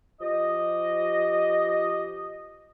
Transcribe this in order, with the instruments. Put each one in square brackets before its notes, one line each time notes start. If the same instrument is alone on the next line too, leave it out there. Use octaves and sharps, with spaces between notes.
[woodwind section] F3 G4 D#5